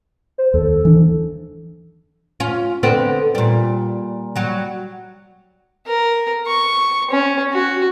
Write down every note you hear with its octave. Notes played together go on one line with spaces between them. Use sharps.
C5
D#2 A4
E3 D4
C#4 F4
D3 B3 C4
A#2 G3
F#3 G3
A#4
C#6
C#4
F#4